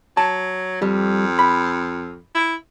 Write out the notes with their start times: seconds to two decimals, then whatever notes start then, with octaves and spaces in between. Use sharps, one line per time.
0.17 F#3 A5
0.82 F2 G3
1.39 B5
2.35 E4